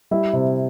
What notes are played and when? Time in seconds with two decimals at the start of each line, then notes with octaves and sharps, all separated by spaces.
0.11 G3 E4
0.33 C3